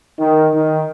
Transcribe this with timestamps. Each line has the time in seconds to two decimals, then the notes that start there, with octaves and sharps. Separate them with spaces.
0.19 D#3
0.54 D#3